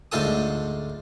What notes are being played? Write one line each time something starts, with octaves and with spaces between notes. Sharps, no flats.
D2 G#2 F4 A4 A5 D#6